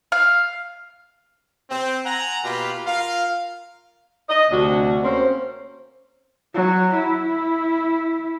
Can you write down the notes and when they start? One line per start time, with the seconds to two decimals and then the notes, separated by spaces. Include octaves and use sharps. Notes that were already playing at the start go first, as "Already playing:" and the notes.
0.12 F5
1.70 C4
2.06 F#5 G#5 A#5
2.44 B2 A#3 F4 G4 B5
2.86 F4 A#4 F5
4.29 D#5
4.50 D2 C3 D4 F#4
5.03 A#3 C4 C#4 C5
6.54 F#3
6.94 E4